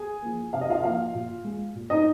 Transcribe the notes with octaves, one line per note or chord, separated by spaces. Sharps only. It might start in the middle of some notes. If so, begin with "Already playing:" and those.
Already playing: G#4 G#5
F3 A#3
C3 F5
D#5
F4 F5
F3 A#3 F4 F5
A#2
G#3
A#2
D#4 D#5